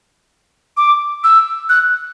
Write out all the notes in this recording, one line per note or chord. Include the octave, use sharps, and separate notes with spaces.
D6
E6
F#6